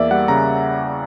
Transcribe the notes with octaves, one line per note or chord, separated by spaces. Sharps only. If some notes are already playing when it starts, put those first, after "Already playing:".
Already playing: E2 A#3 D5 E5
G3 F#5
C#3 A#5